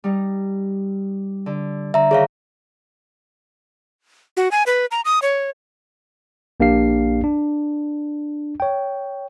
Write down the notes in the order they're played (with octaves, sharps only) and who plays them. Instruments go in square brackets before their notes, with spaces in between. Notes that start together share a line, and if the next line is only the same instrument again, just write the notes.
[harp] G3 D#4
D3
[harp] D3 [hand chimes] E5 A#5
[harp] D#3 A#5 [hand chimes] G#4 C#5 F5
[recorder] F#4
G#5
B4
A#5
D#6
C#5
[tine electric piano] A#1 A#3 D4 G4 F5 C7
D4
C#5 G5